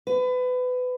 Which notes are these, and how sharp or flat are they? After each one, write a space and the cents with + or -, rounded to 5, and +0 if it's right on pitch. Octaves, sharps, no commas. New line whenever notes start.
B4 +25